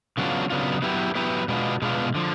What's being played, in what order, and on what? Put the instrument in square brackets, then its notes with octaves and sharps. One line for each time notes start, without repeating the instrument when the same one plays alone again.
[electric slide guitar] C#3 F#3 B3 D4 F4
C#3 F#3 B3 D4 F4
F#3 B3 E4 G4 B4
F#3 B3 E4 G4 B4
B2 G#3 B3 D4 F4
B2 G#3 B3 D4 F4
D3 F3